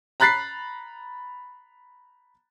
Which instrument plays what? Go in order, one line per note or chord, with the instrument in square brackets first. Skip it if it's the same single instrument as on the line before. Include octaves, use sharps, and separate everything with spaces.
[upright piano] A#5 B5 F#6 A6 B6 C7